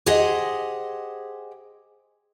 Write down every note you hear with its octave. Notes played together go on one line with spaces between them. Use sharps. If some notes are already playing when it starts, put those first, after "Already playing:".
G4 G#4 C5 D#5 F#5